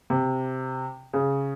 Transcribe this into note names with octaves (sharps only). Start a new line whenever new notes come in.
C3
C#3